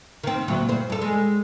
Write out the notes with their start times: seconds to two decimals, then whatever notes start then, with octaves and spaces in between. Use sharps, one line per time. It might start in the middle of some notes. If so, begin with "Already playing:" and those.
0.23 D#3 C4
0.48 D2 A#2 F#3
0.68 G2 C5
0.90 G2 A4
1.02 G#3